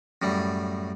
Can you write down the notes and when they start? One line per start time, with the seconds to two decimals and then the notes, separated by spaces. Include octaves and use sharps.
0.22 F#2 A2 G3